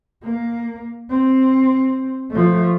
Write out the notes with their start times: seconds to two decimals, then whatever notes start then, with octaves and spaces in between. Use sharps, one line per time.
0.23 A#3
1.10 C4
2.31 F3 A3